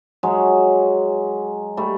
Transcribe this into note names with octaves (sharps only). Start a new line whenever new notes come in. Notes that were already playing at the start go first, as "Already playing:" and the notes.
F#3 G#3
G3 A3